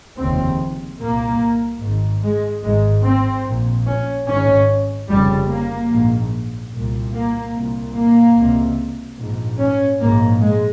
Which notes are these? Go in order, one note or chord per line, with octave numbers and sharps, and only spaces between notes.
F1 D#2 C#3 C4
C2 A#2 A#3
G#2
G#1
G#3
G#1 G#2 G#3
C4
A#1 A#2
C#4
G#1 G#2 C#4
F1 F2 C#3 G3
A#3
A#1 G#2
C2 A#2
A#3
C2 A#2
A#3
C#2 C3
A#1 G#2
C#4
A#1 G#2 A#3
G#3